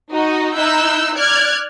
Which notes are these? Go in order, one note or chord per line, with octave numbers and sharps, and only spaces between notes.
D#4 F#4 D#5
D#4 E4 E6 F#6 G6
D5 F6 F#6 G#6